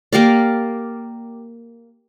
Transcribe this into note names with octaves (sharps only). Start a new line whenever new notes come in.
A#3 G4 A#4 D5